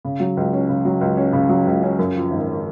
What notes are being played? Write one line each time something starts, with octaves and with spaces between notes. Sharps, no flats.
C#3
F#3
C#2
C#4
C#3
F#3
C#2
C#4
C#3
F#3
C#2
C#4
F#2
F3
G#1